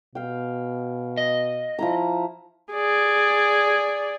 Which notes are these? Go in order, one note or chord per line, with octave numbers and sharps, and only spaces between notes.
B2 F5 G5
D#5
F3 E4 A#5
G#4 D5